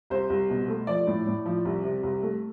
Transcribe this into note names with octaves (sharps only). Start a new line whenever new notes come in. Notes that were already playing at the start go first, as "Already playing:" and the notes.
C2 C5
C2
B2
A3
F3 D5
A2
A2
F3
C2
C3
C2
A3